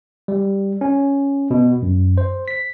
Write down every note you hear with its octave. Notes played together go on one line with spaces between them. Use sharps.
G3
C#4
B2
F#2
C5
B6